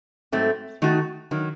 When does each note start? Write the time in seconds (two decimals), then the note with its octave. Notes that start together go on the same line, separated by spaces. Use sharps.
0.32 G#2 F#3 A3 C4
0.82 D#3 A3 D#4 F#4
1.31 D#3 F#3